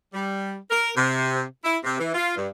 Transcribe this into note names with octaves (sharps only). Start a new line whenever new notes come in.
G3
A#4
C3
E4
C3
E3
F4
G2